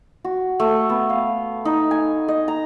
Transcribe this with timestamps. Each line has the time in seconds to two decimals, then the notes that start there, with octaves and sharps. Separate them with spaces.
0.24 F#4
0.60 A3
0.90 B3
1.10 F5
1.65 D#4
1.91 G#5
2.28 D#5
2.48 A#5